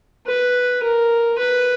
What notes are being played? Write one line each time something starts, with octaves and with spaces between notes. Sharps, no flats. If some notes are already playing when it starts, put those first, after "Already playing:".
B4
A#4
B4